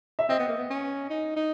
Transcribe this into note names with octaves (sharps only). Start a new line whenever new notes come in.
E5
C4 D#5
B3
A#3
B3
C#4
D#4
D#4